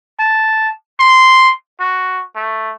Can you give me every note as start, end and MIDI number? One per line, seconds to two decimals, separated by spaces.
0.20 0.69 81
1.00 1.50 84
1.80 2.22 66
2.36 2.73 57